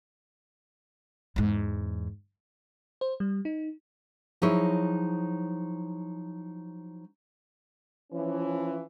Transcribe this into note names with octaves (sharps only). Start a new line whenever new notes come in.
E2 G#2
C5
G3
D#4
F3 F#3 D#4 E4 G#4 C#5
E3 F3 C#4